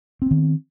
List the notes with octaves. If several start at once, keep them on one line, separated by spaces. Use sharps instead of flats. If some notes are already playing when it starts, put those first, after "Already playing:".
D#3 B3 C4